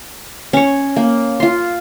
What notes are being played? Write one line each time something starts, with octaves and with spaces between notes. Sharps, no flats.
C#4 C#5
A#3
F4 C6